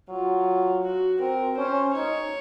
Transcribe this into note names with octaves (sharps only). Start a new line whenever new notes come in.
F#3 F4
F#4
C4 A#4
C#4 C5
D#4 C#5